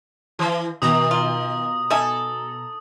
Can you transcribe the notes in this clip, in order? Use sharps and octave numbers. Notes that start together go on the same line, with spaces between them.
E3
B2 D#3 A#5 D#6
F4
D#4 A4 E5 G#5